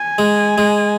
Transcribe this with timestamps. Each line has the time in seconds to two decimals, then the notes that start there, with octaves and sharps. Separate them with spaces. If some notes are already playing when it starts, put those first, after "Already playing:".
Already playing: G#5
0.18 G#3
0.58 G#3